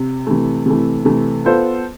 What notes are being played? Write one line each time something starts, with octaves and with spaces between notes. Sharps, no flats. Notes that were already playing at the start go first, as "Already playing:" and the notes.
Already playing: C3
C3 E3 A3
C3 E3 A3
C3 E3 A3
B3 F4 A4 C5